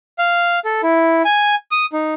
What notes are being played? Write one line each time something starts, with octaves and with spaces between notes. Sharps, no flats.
F5
A4
E4
G#5
D#6
D#4